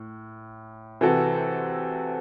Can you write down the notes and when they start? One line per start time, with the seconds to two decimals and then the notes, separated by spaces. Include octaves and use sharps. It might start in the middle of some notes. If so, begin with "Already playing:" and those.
Already playing: A2
1.01 C3 E3 C4 F#4 A4